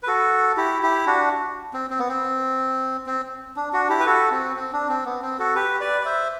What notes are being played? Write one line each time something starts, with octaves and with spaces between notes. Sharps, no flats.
B4
F#4 A4
E4 G4
E4 G4
D4 F#4
C4
C4
B3
C4
C4
D4
D4 F#4
E4 G4
B4
F#4 A4
C4
C4
D4
C4
B3
C4
F#4 A4
G4 B4
B4 D5
D5
C5 E5